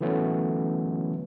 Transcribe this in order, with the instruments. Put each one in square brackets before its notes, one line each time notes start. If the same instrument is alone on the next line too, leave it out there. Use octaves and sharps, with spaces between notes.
[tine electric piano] D3 E3 F#3 A3 B3 C#4